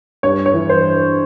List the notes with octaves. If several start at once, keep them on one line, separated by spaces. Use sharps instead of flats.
G2 C#5
C#5
E3
C5